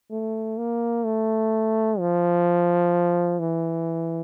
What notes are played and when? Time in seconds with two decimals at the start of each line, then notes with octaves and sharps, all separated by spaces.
0.11 A3
0.58 A#3
1.05 A3
1.99 F3
3.39 E3